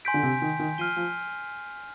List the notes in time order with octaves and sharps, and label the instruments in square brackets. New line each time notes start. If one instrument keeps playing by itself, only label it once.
[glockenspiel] G#5 C6 G6 B6 D7
[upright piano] D3
C3
D#3
D#3
[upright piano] F3 [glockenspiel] F6 C7 D#7 G7
[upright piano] F3